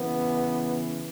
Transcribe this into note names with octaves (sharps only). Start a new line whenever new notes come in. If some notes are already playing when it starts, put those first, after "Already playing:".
Already playing: C#3 E3 B3